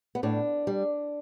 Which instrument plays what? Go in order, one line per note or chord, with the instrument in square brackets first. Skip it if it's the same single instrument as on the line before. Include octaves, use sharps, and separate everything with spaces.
[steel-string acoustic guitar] B3
A2 D4
G3